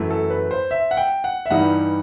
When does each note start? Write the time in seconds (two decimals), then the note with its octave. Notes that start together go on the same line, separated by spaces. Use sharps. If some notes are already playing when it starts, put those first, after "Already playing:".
Already playing: F#2 E3 A3
0.10 A4
0.30 B4
0.51 C5
0.71 E5
0.91 F#5
0.97 G5
1.24 F#5
1.46 E5
1.50 G2 E3 G3 D#4 F#5